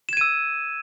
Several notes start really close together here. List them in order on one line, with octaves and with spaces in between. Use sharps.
E7 G#6 D#7 E6